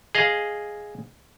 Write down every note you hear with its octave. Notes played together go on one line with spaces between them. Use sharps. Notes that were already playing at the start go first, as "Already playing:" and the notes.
G#4 D#5 F5